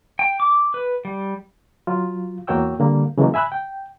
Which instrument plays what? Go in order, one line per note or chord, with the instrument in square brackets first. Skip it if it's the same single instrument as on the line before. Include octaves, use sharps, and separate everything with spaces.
[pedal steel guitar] G5
D6
B4
G3
[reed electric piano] F#3 F4
E2 A#3 F#4 C#5 G5 E6
D3 G3 A#3
C#3 E3 F#3 G#3 A#3
E5 G#5 B5 E6 F#6
G5